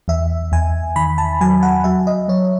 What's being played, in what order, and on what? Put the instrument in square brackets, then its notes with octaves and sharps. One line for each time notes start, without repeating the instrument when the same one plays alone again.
[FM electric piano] E2 E5
E2 G#5
D#3 B5
A5
F#3 G#5
F#5
F#3 E5
D#5
F#3 C#5